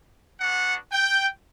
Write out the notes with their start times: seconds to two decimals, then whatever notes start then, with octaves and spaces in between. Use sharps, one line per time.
0.40 B3 D4 F#4 F#5
0.92 G5